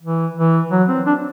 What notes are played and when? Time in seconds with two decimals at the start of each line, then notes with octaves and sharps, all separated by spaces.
0.03 E3
0.37 E3
0.71 F#3
0.89 C4
1.06 D4